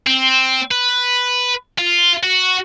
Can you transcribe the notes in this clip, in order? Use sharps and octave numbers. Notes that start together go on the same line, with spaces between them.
C4
B4
F4
F#4